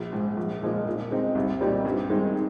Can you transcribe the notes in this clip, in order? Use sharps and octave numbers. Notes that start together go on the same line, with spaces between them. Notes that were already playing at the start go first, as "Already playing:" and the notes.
Already playing: A#1
G#2 F3
A#1
A#2 F3 G#3 D#4
A#2
G#3 C4 D#4
C2
A#2 G3 C4 D#4
G2
D#3 G#3 C4 D#4